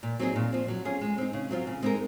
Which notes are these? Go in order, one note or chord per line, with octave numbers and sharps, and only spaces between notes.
A#2
F#3 C4 D#4 G#4
A#2
F3 C4
F#3
C#4 F4 G#4
G#3
C4 D#4
C#3
F#3 C4 F4
C#3
G#3 C4 D#4 A#4